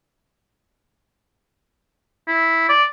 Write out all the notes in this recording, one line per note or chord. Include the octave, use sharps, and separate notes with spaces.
E4
D5